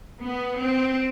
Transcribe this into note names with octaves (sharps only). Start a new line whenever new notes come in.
B3
C4